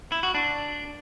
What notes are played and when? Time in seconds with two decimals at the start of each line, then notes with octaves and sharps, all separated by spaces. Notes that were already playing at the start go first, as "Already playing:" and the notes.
0.12 E4
0.23 F#4
0.34 D4